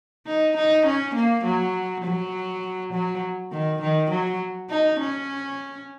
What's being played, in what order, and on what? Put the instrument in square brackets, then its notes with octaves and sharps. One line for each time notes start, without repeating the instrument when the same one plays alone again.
[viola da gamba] D#4
D#4
C#4
A#3
F#3
F#3
F#3
D#3
D#3
F#3
D#4
C#4